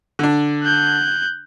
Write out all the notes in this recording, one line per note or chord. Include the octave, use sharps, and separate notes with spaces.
D3 D4
F#6 G6